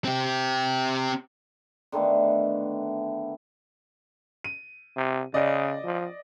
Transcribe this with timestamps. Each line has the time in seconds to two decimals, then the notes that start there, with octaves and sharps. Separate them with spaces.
0.05 C4 G4
1.92 D3 D#3 A3 B3
4.44 D#7
4.96 C3
5.34 C#3 D5 D#5
5.84 F3